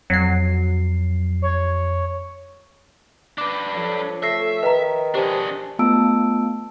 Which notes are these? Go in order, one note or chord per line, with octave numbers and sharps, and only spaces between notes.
F2 F#3 C7
C#5
D4 B4 D6
F3 A4 C#5
A3 E5 A#6 C7
D#3 B4 A#5
D4 G4 G#4 C5 A5
A3 B3 F4 A5 E6 D7